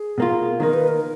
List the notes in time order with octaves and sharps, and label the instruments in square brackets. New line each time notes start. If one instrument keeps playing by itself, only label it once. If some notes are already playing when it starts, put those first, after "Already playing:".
Already playing: [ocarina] G#4
[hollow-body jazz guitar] B2 A#3 F4
[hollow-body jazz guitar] D#3 A#3 D#4 [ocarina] A#4
[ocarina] B4
A#4